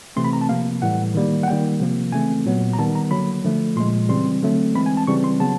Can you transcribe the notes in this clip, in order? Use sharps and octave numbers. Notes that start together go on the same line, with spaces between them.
C3 E3 A3 C4 C6
B5
A#5
A5
C3 F3 A#3 F5
A2 E3 G3 F#5
D#3 G3 A#3
F#5
D#3 G3 A#3 G5
C3 F3 A#3
C#3 E3 A3 C4 G#5
A#2 F#3 B3
A#5
D#3 G3 B3 A5
A#5
D3 F#3 A#3 B5
D3 F3 A3
A#2 F3 G#3 C6
C#3 E3 G3 C4 C6
D3 F#3 A3 C4
E3 G#3 C4 B5
G#5
A5
C#3 E3 G3 C4 C#6
C6
C#3 F#3 B3 A5